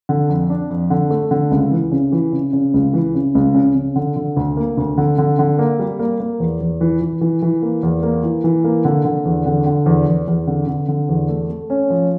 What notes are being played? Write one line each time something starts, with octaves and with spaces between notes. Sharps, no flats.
D3
F2
D4
F2
D3
A3
D3
C#2
E3
C#3
E3
C#3
C#3
C#2
E3
C#3
C#2
C#3
C#3
D3
D3
D2
A#3
D2
D3
D3
D3
A#3
G3
A#3
A#3
E2
E2
E3
E3
E3
E3
A#3
E2
A#3
E3
E3
A#3
D3
D3
E2
D3
D3
E2
E2
E2
D3
D3
D3
E2
A3
A3
C#4
F3